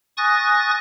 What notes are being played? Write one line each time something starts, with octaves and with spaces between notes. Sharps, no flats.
G#5 C#6 D#6 F#6 A6 A#6